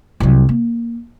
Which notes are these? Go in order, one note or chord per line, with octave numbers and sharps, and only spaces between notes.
C2 F#3
A#3